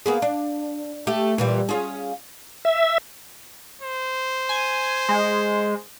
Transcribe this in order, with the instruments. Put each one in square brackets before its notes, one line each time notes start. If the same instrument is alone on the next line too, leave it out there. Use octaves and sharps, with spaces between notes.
[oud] A#3 B3 G#4
D4
A3 G4
A#2 E3 G3
C#4 F4 G#4
[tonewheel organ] E5
[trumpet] C5
[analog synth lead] G#5
G#3